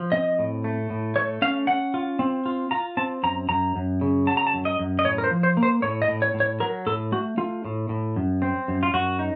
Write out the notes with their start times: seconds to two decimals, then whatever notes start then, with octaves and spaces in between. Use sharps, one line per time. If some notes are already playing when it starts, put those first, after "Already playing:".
Already playing: F3
0.12 C4 D#5
0.39 A2
0.64 A3
0.90 A2
1.16 A3 C#5
1.42 C#4 F5
1.67 C#4 F#5
1.94 F4
2.19 C4
2.46 F4
2.71 F4 A#5
2.97 C4 A5
3.23 F#2 A#5
3.49 F#2 A#5
3.76 F#2
4.01 C#3
4.27 F#3 A5
4.37 A#5
4.47 A5
4.54 F#2
4.65 D#5
4.79 F#2
4.99 D#5
5.05 A2 C#5
5.18 A#4
5.24 C5
5.31 F3
5.43 C5
5.57 A#3
5.63 C5
5.82 A2 C#5
6.02 D#5
6.08 A2
6.22 C#5
6.34 A2
6.40 C#5
6.60 F#3 A#4
6.87 A2 A4
7.12 A3 F#4
7.37 A3 F4
7.65 A2
7.89 A2
8.16 F#2
8.42 C4
8.68 F#2
8.83 F4
8.94 F#2 F#4
9.19 D#4